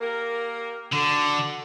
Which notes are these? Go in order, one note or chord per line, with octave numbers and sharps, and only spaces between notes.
A#3 G4 A#4
D3 F#4 A4